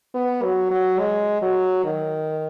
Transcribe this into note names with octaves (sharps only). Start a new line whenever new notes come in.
B3
F#3
F#3
G#3
F#3
D#3